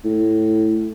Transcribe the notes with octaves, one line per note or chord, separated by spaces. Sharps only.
A2